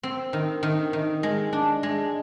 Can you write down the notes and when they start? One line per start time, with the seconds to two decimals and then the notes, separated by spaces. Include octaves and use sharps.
0.03 C4
0.33 D#3
0.63 D#3
0.93 D#3
1.23 G#3
1.53 D4
1.83 G#3